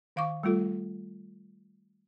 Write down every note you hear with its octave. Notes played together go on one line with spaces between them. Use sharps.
D#3 F5 C#6 D6
G3 A3 F4 A4